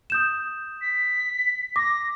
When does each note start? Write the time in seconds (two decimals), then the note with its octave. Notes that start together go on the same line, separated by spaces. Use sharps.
0.10 D#6 G6 E7
0.81 B6
1.76 D6 A#6